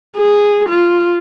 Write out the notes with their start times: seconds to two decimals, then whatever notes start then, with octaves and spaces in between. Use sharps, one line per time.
0.17 G#4
0.69 F4